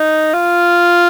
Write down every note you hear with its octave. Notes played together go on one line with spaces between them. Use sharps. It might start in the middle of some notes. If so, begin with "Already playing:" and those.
Already playing: D#4
F4